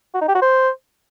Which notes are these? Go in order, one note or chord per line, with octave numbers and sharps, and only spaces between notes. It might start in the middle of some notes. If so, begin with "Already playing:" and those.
F#4
D#4
G4
F#4
C5